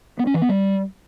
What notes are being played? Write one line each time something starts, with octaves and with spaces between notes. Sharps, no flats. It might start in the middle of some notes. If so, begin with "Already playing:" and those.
B3
C#4
E3
B3
G3